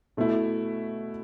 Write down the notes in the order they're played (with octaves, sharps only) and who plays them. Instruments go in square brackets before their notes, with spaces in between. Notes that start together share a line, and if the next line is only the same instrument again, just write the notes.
[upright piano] B2 A3 E4